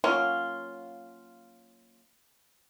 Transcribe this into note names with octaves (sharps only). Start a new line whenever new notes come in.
F#3 A#3 C#4 F4